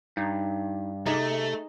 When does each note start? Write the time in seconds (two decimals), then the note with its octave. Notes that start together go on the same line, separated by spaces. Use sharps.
0.17 G2 D#4
1.06 C3 A3 D#4 G#4